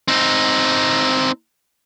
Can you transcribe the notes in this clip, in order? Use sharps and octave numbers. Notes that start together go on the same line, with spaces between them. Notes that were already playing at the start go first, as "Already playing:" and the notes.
C4 D#4